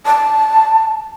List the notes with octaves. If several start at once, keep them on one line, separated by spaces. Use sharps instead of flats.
A5